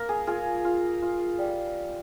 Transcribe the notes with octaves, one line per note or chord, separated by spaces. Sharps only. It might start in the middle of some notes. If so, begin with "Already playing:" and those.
Already playing: A#3 A#4
G#4
F4 G#4
F4
F4
G3